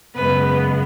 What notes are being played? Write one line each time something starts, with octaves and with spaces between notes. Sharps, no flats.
F#2 C#3 G#3 B3 B4